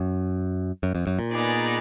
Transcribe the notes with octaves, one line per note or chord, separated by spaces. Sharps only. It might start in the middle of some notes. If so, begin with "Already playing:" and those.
Already playing: F#2
F#2
F2
F#2
A#2
B3 D#4 G#4 D5